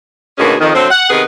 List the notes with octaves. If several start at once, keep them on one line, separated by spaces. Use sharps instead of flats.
D2 B2 D#3 A#3 C#4 G#4
F2 D#3
D3 F#3 A3 C4
F#5
C3 D#3 B3 G#4 B4